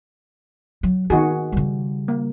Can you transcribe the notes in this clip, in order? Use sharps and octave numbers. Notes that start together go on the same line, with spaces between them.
F#3
D#3 B3 F#4 G#4
C#3 G3
A#3